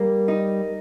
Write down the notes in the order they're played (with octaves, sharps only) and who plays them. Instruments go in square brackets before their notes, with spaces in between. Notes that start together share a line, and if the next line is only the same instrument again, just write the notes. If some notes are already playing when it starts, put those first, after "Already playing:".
Already playing: [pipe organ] G3 [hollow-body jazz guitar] A#3
[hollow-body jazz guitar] D#4